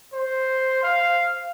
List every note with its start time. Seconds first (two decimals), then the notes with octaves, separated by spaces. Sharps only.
0.14 C5
0.83 F5